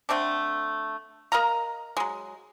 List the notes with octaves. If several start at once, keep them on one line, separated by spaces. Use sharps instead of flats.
D3 A3 C4 D4
A#4 D#5 F5 A#5
F#3 G#3